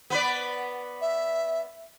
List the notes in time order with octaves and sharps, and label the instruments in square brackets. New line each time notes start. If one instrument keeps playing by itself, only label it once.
[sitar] B3 B4 D5
[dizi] E5